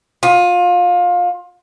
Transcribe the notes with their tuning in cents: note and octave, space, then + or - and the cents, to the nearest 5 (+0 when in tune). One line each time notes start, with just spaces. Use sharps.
F4 +25